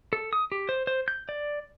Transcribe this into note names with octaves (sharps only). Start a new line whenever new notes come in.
A4
D#6
G4
C5
C5
G6
D5